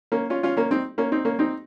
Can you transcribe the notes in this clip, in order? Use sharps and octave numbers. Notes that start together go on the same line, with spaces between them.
A#3 C#4
C#4 F4
C#4 F4
A#3 C#4
C4 D#4
A#3 C#4
C4 D#4
A#3 C#4
C4 D#4